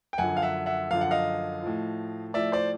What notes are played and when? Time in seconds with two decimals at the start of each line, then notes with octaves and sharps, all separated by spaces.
0.13 G5
0.18 F#2 D3 F3 F#5 G#5
0.37 F5
0.42 E5 F#5
0.66 E5 F#5
0.91 F#2 D3 F3 F5
1.01 F#5
1.11 D#5 F5
1.62 A2 F3
2.34 A2 F3 D5 E5
2.52 C5 D5